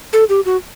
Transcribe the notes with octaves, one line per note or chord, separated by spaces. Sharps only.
A4
G4
F#4